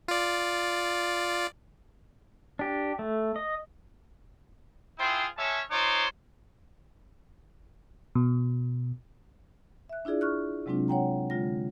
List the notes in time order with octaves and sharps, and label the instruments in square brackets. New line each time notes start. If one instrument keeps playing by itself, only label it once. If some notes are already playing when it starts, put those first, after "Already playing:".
[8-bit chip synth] F4 D5
[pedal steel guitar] D4 G4
A3
D#5
[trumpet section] E4 F4 G#4 C5 G5
G#3 C#4 C#5 E5 A5
D#4 F4 C5 C#5 D6
[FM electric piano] B2
[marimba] E5 F#6
D4 E4 F4 G#4 D5
C#6 F6 F#6
C3 F#3 G#3 C4 D4 F4
C#5 F#5 G5 A#5
D3 G#3 F4 A#6